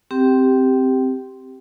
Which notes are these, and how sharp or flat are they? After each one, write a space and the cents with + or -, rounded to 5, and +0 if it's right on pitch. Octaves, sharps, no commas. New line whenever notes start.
C4 +0 G4 +0 G5 -25